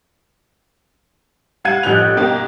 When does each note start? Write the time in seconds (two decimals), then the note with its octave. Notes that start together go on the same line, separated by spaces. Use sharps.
1.64 G3 F5 F#5 G#6 D#7
1.83 A1 F3 G3 F#6 G6 F7
2.16 G2 B2 A#3 D#4 G4